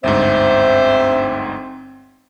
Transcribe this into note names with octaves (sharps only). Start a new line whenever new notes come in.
G1 D2 G#2 C4 C5 E5